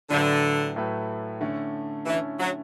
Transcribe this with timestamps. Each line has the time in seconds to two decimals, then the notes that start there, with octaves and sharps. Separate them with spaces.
0.10 A2 D3 F#3 A3 E4 B4
0.76 A2 F#3 A3 E4 B4
1.41 D3 A3 C#4 E4
2.06 D3 E3 A3 C#4 E4
2.39 F#3